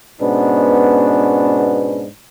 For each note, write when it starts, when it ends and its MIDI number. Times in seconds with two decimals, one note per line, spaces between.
0.21 2.07 44
0.21 2.07 47
0.21 2.07 59
0.21 2.07 61
0.21 2.07 62